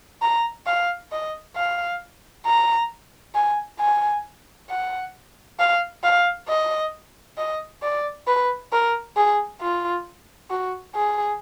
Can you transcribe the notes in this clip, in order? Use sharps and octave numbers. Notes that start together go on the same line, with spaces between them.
A#5
F5
D#5
F5
A#5
G#5
G#5
F#5
F5
F5
D#5
D#5
D5
B4
A#4
G#4
F4
F#4
G#4